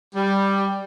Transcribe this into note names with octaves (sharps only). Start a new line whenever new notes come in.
G3